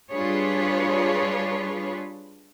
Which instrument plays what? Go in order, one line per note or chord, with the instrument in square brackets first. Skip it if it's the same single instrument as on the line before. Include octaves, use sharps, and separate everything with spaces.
[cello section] G3 D4 F4 G#4 B4 C#5